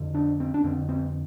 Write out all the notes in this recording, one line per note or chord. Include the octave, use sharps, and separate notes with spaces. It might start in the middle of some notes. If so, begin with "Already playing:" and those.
Already playing: F2 D3
D4
C4
D4
F2 D3 C4
C4